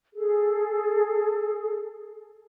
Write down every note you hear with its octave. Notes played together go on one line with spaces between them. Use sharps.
G#4 A4